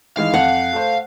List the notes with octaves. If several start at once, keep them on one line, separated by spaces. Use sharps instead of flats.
D#3 E3 G#3 F5
F2 F#5
A3 C5